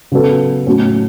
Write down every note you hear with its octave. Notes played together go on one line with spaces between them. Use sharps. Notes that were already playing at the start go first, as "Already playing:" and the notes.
C#3 F#3 B3 A4
A2 F#3 C#4